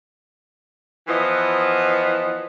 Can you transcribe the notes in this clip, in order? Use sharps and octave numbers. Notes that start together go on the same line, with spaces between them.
E3 F3 B3 E4 D#5